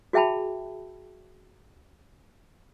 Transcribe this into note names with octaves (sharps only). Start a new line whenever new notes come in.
F#4 G#4 E5 G5 A5 B5